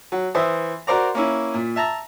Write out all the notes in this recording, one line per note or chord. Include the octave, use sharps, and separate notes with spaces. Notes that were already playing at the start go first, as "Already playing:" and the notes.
F#3
E3 C5 E5 D#6
F#4 A#4 C5 D5 A#5
A#3 C#4 E4
A#2
E5 A5 A#5